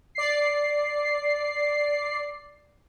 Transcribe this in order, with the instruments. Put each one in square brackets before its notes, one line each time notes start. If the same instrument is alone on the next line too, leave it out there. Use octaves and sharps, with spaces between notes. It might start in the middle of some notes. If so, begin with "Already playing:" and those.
[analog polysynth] D5 C7